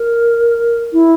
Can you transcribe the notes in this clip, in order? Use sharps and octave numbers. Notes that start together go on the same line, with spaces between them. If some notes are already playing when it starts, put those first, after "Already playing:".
Already playing: A#4
E4